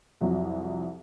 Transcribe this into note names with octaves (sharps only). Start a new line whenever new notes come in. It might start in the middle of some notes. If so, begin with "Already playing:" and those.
C2 F2 F#3